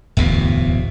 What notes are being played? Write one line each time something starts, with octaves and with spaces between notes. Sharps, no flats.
D1 G1 E2 B2